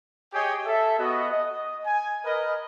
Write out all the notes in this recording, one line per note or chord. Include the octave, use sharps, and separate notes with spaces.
G4 G#4 C#5 D#5 G5 G#5
A4 E5
B3 F#4 D#5
D#5
G#5
A#4 B4 D#5